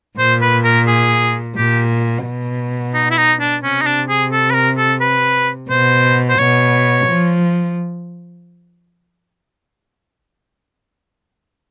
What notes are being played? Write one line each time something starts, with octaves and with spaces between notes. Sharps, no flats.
A#2 C5
B4
A#4
G#4
A#2 G4
B2
D#4
E4
D#4
D4
C3 C#4
D#4
D4
G#4
A4
B4
A#4
A4
B4
B2 C5
C5
B2 C#5
F3